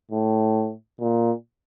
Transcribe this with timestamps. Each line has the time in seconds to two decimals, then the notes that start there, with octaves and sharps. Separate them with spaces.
0.11 A2
1.00 A#2